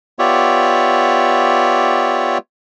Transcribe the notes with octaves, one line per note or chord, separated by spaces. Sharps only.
B3 F4 G4 C#5 D5 E5